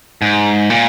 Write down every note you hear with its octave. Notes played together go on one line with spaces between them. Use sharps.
G#2
A#2